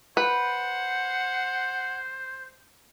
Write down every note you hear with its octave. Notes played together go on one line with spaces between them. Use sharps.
B4 C5 F#5